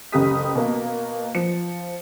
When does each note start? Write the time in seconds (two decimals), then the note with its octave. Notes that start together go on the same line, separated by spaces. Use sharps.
0.12 F#1 C#2 G4 A4 D#6 B6
0.55 B2 A#3 D#5
1.35 F3 C#7